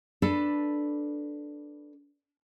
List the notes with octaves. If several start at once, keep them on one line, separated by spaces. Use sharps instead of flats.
D4 A4 B4